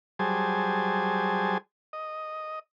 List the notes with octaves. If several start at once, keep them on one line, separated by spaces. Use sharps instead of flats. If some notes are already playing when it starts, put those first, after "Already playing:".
F#3 G3 G#4 C5 G#5 A5
D#5